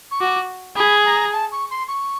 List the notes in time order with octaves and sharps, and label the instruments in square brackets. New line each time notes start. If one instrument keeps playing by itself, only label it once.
[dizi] C#6
[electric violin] F#4 [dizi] D6
[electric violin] G#4 [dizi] B5
[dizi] A#5
A5
C#6
C6
C#6